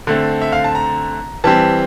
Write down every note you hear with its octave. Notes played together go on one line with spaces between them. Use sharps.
D3 A3 C4
E5
F5
A5
A#5
E3 G3 C4 A5